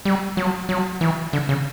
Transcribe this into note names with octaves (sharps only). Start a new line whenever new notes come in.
G3
F#3
F#3
E3
D3
C#3